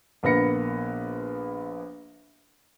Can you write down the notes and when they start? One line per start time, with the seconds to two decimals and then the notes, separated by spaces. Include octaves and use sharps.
0.23 A#1 A#3 B3 B4 A#6 C#7